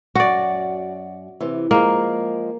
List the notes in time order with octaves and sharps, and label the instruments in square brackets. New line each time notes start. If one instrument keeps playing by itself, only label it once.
[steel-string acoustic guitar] F#2 [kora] F#4 D5
[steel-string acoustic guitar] C3 E3
[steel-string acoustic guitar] F3 G#3 [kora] A#3